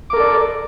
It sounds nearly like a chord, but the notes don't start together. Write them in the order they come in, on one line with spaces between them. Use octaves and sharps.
D6 A#4 A4 D5